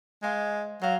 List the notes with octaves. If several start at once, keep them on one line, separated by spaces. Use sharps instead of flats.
G#3 C5 F5 C6
F#3 C5 F5